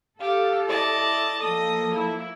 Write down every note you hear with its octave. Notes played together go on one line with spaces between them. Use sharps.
G4 A4 F5
E4 D5 D#5 A5
F3 A#3 A4 D#5 D#6
E4